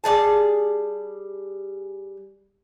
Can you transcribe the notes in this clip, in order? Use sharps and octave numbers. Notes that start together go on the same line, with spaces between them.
G3 G#3 G#4 A5